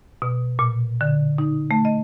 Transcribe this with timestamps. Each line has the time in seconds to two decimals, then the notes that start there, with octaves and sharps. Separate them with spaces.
0.22 B2
0.59 A#2
1.01 D3
1.38 D#4
1.71 A3
1.85 D#5